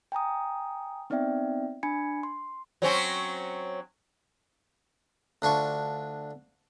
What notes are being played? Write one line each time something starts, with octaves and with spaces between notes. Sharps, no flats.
G5 G#5 A#5 D#6
B3 C4 D#4 D5 E5 G5
D4 G#5 B5 G#6 C#7
C6
F#3 C4 C#4
D2 D4 F4 C#6